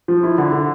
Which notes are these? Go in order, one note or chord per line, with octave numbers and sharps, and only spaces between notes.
F3
E4
D3
D3